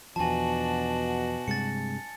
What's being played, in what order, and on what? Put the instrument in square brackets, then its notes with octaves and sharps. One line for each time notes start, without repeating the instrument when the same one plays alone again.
[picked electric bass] E2 F3 [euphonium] B2 [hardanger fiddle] D4 F#4 [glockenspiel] G#5 A5
[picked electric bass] G2 C3 G#3 [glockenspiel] A6 C#7